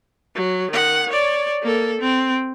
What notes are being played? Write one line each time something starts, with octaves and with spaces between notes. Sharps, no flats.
F#3
D#3 F#5
C#5 D5
A#3 A4
C4